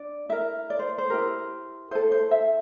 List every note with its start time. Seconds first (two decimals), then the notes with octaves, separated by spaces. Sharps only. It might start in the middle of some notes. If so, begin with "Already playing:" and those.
Already playing: D4 D5
0.29 E4 A#4 E5
0.70 D5
0.79 C5
0.98 C5
1.10 E4 G4 A#4
1.91 E4 A4 C5
2.12 C5
2.31 E5